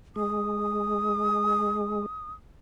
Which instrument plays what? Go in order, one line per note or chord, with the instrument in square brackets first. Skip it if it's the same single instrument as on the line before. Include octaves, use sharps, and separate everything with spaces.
[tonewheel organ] G#3 [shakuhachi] D#6